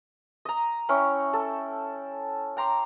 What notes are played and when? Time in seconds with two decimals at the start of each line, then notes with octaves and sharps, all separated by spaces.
0.45 D#5 A#5
0.89 C#4 E4 G5 C#6
1.33 A4
2.57 G5 A#5 C6 D6